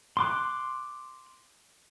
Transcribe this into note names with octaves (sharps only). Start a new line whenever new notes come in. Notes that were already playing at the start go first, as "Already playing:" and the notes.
C6 D6 F#6